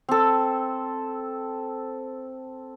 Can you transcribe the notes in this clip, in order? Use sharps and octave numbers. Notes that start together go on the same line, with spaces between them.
C4 A4